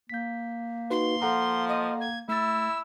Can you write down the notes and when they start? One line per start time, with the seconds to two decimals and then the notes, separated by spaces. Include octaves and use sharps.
0.10 A#3 G6 B6
0.90 D#4 F#4 B4 C6
1.22 F3 A4 F#5 A#5
1.68 D#5
2.00 G#6
2.29 A3 E4 E6 A6